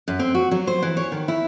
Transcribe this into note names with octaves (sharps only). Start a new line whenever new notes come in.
F#2
C4
F#4
F#3
C5
E3
C#5
D#3
E4